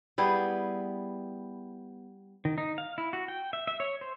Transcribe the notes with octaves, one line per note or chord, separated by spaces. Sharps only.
G3 B3 E4 G#4
D#3
D#4
F5
E4
F#4
G5
E5
E5
C#5
C5